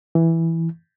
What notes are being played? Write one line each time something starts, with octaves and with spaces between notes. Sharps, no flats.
E3